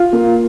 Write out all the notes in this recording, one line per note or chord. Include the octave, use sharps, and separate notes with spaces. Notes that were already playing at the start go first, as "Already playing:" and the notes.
Already playing: F4
A#3